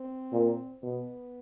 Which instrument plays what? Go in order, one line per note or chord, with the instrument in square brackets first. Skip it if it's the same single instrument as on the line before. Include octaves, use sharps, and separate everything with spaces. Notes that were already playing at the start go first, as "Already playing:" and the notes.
Already playing: [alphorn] C4
[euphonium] A#2
[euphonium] B2 [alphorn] B3